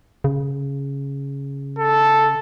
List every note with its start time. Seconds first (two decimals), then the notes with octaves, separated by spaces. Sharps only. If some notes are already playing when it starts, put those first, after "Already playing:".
0.24 C#3
1.79 A4